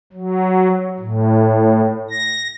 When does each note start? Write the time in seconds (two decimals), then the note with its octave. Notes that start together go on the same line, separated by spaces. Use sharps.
0.13 F#3
0.99 A2
2.11 A#6